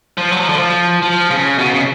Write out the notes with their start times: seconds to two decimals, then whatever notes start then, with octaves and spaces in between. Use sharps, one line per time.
0.18 F3
0.32 F#3
0.40 F3
0.49 D3
0.57 F3
1.02 F3
1.31 C#3
1.58 B2
1.74 C#3